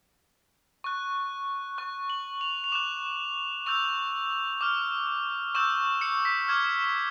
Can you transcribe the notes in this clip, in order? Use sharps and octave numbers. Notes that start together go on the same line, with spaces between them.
C#6 F#6
C#6 F#6
F#7
F7
F7
D6 F#6 E7
C#6 E6 G6 F7
D6 F6
C#6 E6 G6 E7
C#7
B6
D6 F6 G#6